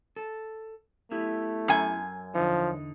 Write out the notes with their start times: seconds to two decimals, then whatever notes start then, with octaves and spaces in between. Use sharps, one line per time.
0.16 A4
1.11 A3 B3 E4 G4
1.68 F#2 G#5
2.35 E2 D3 F3 D#4